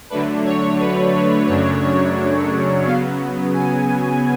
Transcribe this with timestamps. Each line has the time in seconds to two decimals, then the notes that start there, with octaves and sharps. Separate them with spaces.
0.10 D3 F#3 A3 D4 B4
0.45 C#5
0.80 B4
1.48 F#2 C#3 F#3 A3 D4 C#5
1.82 C#5
2.85 C#3 F#3 B3 F5
3.54 G#5